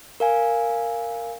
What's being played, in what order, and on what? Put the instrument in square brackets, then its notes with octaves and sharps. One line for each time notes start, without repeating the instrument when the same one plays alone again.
[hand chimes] A#4 F5 G#5